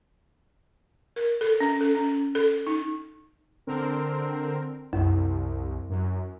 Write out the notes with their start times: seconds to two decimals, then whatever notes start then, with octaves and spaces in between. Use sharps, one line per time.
1.16 A#4
1.41 A4
1.60 C#4
1.81 A4
1.95 C#4
2.35 A4
2.67 D#4
3.67 D3 C4 A#4
4.93 C2 F#2
5.89 F#2